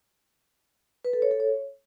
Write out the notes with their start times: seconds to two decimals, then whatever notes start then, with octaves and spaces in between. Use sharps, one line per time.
1.05 B4
1.13 A4
1.22 C#5
1.31 A4
1.40 C#5